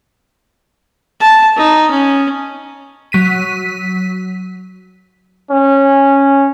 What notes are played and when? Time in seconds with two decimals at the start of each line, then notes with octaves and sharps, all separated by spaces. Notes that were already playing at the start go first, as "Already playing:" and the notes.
1.20 A5
1.57 D#4
1.91 C#4
3.12 F#3 B6 D#7
5.51 C#4